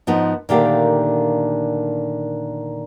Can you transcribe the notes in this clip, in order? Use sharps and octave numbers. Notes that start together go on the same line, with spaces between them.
G#2 F3 B3 D#4
A#2 D3 D#3 A3 G4 F5